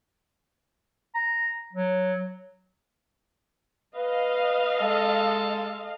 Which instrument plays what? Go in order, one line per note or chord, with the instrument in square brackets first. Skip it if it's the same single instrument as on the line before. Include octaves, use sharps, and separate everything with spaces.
[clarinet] A#5
F#3
[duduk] B4 [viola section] D#5 F5
[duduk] G#3 [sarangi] A4